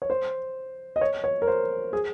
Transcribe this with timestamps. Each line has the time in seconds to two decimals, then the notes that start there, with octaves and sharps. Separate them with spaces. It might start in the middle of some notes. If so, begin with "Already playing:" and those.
0.02 C#5
0.10 C5
0.96 D#5
1.01 C#5
1.24 C#5
1.42 A#4
1.47 C5
1.93 G#4